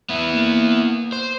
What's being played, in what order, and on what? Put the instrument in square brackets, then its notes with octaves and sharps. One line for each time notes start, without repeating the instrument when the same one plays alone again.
[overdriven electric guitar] B3 E4
[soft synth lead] A#3
[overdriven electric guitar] C5